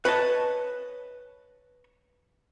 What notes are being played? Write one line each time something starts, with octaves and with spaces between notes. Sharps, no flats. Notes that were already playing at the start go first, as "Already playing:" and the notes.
B4 C#5 D#5 A5